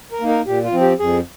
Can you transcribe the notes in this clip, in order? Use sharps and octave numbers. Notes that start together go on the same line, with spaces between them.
A#4
A#3 D#4
A#4
A#2 G4
F4
F3 C4
G4
F2 G#4